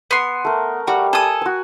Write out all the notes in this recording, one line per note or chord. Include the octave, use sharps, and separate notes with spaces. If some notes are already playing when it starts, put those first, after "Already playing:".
B3 C6
A3 A#4
G3 F#4
A4 G#5 D#6
F#4 G#5